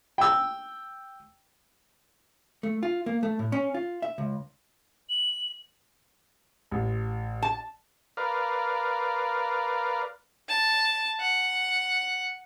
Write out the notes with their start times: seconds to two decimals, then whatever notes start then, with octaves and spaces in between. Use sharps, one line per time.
0.18 G5 E6
2.63 A3
2.83 F4
3.06 A#3
3.23 A3
3.39 A2
3.52 C#4
3.74 F4
4.02 E5
4.18 C#2
5.09 F#7
6.71 A1
7.42 A5
8.17 A#4 B4 D5 F5
10.49 A5
11.20 F#5